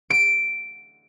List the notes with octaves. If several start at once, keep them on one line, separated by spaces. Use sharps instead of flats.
D7